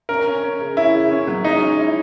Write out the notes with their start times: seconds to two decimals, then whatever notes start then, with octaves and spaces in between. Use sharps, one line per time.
0.09 C#4 A#4
0.27 C#4
0.43 C#4
0.60 C#3
0.77 C#4 E4
0.94 C#3
1.11 C#4
1.27 F#3
1.44 G#3 D#4
1.62 C#4
1.79 E4